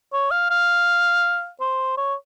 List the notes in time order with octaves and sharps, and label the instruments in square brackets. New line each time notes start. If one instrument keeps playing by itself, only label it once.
[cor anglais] C#5
F5
F5
C5
C#5